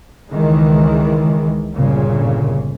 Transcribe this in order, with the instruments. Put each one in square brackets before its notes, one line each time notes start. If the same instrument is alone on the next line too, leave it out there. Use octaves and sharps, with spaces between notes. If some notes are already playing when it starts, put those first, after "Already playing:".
[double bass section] C#2 D#3 E3 G#3
G1 A#2 C#3